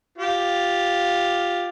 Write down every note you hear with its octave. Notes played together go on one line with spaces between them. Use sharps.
F4 G4